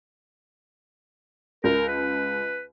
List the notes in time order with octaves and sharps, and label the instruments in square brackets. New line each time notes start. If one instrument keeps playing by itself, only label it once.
[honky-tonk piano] C#2 [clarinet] A#4
[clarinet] B4